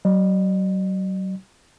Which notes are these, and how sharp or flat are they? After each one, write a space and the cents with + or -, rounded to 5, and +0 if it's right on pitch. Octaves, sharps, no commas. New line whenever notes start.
F#3 +35 D#5 -45